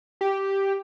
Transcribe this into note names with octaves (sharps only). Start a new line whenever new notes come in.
G4